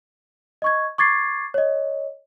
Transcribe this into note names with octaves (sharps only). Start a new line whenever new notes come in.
D#5 C#6 G#6
C#6 D6 G#6 A6 C7
C#5 D#5